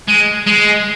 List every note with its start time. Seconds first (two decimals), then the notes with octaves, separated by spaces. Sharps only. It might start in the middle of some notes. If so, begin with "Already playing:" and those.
0.08 G#3
0.46 G#3